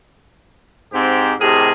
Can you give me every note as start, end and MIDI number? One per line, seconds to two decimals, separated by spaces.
0.93 1.33 44
0.93 1.33 60
0.93 1.33 67
1.40 1.70 45
1.40 1.70 48
1.40 1.70 67
1.40 1.70 68
1.40 1.70 70
1.40 1.70 75